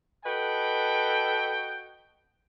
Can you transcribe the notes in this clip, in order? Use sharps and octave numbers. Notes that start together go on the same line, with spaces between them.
F#4 A4 B4 D#5 G5